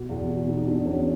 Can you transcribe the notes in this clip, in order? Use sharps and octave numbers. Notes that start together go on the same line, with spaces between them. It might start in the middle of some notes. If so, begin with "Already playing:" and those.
Already playing: B2
E2
B2
B2 D#4
B2 D4
E2 C#4